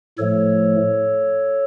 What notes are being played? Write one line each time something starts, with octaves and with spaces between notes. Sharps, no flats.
A2 F3 A3 A4 C#5